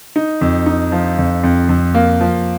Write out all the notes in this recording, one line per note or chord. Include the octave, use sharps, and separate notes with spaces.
D#4
F2
D#4
F3
F2
F2
F2
A#3
F3